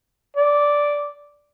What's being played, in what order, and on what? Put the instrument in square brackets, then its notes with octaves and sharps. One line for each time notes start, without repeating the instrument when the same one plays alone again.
[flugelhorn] D5